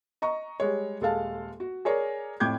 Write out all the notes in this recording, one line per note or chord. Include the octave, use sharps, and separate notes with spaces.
D#5 A#5 C#6
G3 G#3 C#5
D#1 G#3 A4 F5 A5
F#4
G#4 A#4 C#5 D5
F2 A2 G5 D6 G6 G#6